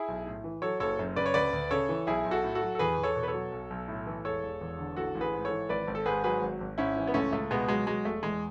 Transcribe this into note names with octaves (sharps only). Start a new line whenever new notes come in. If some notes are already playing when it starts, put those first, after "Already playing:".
Already playing: E4 G#4
B1
A2
E3
F#3 A4 C#5
F#1 A4 C#5
F#2
C#3 B4 D5
C#5
D2 B4 D5
D2
C#3 A4 C#5
E3
B1 E4 G#4
B1
F#4 A4
A2
F#4 A4
F#3
A4
E2 G#4 B4
E2
A4 C#5
B2
B4
A4 C#5
F#3
B1
B1
A2
E3
E1 A4 C#5
E1
E2
D3
A1 F#4 A4
A1
G#4 B4
G#2
A4 C#5
E3
G#1 B4 D5
G#1
A4
G#2 G#4 B4
F#3 G#4 B4
G#1
G#1
G#2 C#4 E4
E3
B3
C#2 A3 C#4
C#2 A3
B2 G#3 B3
F#3 G#3
F#3 G#3
E1 A3
E2 G#3